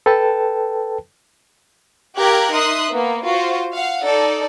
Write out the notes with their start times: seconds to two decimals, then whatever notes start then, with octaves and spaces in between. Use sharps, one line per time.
0.06 A4 B4 G5 A5
2.18 G4 A#4 F5 G5 F#6 G#6
2.53 D#4 E5 C6 D#6 F#6
2.91 A#3 B3
3.25 F4 F#4 C5
3.74 F5 F#5
4.05 D#4 A4 D5